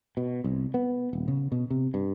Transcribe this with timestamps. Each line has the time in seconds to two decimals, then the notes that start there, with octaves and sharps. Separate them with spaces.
0.17 B2
0.44 C2
0.74 B3
1.13 D#1
1.28 C#3
1.52 B2
1.70 C3
1.94 G2